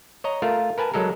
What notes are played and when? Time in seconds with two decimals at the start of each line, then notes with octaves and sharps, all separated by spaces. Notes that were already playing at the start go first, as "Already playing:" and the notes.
0.24 C#5 D#5 A#5
0.42 A3 F4 A#4
0.78 A#4 B4 G#5 A5
0.94 F#3 G#3 A4 A#4